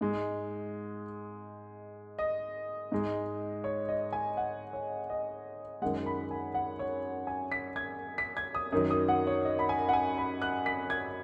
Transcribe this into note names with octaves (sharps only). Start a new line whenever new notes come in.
G#2 G#3
D#5
G#2 G#3
C#5
D#5
G#5
F#5
C#5
D#5
F#2 D#3 G#3 F#5
B5
G#5
F#5
C#5
G#5
B6
G#6
B6
G#6
D#6
F#2 D#3 F#3 D#6
D#6
F#5
C#5
D#5
B5
G#5
F#5
G#5
B5
F#6
B6
G#6